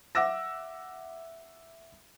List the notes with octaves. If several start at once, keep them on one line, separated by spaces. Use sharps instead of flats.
E5 F#5 D6 E6 A#6